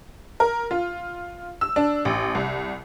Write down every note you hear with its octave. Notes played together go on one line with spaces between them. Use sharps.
A#4
F4
E6
D4
A1
C2